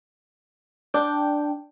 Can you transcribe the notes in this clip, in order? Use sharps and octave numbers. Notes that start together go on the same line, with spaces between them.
D4 G5